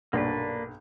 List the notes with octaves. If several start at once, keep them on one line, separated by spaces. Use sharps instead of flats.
B1 G2 A#2 A#3 D4 B4